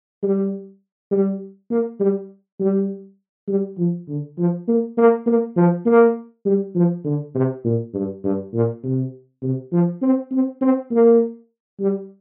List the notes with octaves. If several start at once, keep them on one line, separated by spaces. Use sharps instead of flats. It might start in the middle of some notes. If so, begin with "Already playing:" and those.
G3
G3
A#3
G3
G3
G3
F3
D3
F3
A#3
A#3
A#3
F3
A#3
G3
F3
D3
C3
A#2
G2
G2
A#2
C3
C3
F3
C4
C4
C4
A#3
G3